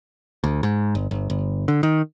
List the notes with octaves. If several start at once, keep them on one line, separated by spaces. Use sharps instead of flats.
D2
G#2
G1
G1
G1
D3
D#3